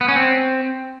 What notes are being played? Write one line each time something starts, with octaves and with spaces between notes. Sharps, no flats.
B3
C#4
C4